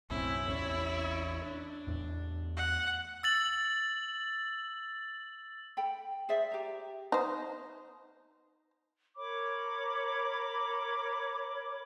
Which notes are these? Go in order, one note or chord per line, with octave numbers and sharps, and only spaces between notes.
B1 F#2 A2 C4 C#4 E4
A1 E2 C#4 C#5 D5
D4
E2 A2
F#5
E6 A6 F#7
A4 G5 B5
G#4 C5 D5 E5
G4 A#5
D#4 C5
A#4 C#5 B5 D6